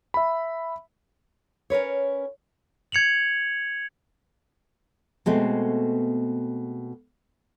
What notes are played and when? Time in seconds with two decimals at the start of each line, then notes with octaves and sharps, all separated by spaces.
0.14 E5 B5
1.70 C#4 A#4 B4 C#5
2.92 G#6 C#7 F7 F#7
5.26 B2 G#3 A3 C4